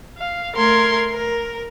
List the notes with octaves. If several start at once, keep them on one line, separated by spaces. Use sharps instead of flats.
F5
A3 A#4 C6 G#6
A#4